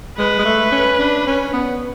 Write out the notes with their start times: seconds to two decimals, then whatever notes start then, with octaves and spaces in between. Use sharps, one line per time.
0.18 G#3 B4
0.39 G#3
0.45 A3
0.72 C#4
0.99 D4
1.27 C#4
1.53 B3